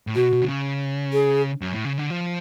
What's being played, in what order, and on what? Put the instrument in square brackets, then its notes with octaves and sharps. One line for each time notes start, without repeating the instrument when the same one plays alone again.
[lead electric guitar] A2
[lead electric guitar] B2 [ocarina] F#4
[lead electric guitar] B2
D3
C#3
[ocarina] G#4
[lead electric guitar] F#2
A2
C#3
D3
F3